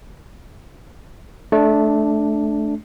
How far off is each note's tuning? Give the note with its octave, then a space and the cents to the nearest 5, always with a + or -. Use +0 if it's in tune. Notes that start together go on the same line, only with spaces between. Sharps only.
A3 -20 D4 +0